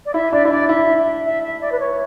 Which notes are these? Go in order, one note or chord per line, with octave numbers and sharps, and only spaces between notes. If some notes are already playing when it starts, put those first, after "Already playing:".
D5
E4 E5
D4 D5
E4 E5
D4 D5
E4 E5
E5
E5
E5
D5
B4
C#5